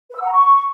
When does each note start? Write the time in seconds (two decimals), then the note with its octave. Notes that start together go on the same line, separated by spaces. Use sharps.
0.10 B4
0.16 E6
0.21 F#5
0.27 A#5
0.32 C#6